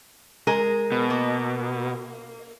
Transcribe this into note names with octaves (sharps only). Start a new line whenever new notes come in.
G#3 G#4 A#4
B2
A#3